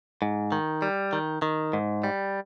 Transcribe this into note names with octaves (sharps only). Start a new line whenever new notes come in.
G#2
D#3
G3
D#3
D#3
G#2
G3